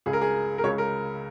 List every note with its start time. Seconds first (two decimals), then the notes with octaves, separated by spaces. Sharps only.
0.06 C#2 C#3 G#3 G#4
0.13 A#4
0.21 G#4
0.58 A#4
0.64 C#2 C#3 G#3 C#5
0.78 A#4